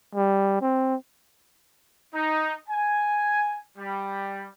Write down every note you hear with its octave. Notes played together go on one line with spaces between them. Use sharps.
G3
C4
D#4
G#5
G3